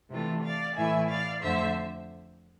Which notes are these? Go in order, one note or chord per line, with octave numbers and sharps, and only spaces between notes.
C3 E3 A3 D4 F4
D5 F5
A2 E3 A3 E4 E5 G#5
D5 F5
F2 D3 A3 C5 E5